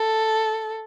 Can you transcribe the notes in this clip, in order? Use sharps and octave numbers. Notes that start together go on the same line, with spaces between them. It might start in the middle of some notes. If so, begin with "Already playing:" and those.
Already playing: A4